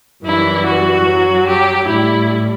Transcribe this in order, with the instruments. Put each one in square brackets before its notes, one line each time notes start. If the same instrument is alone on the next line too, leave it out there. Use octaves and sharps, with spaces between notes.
[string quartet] F#2 E3 G3 E4
F#4
F#2 F#3
G4
A2 G3 E4